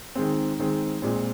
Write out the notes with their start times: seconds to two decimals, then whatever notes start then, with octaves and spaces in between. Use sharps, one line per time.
0.15 D#3 G#3 C4
0.59 D#3 G#3 C4
1.02 A#2 G#3 C4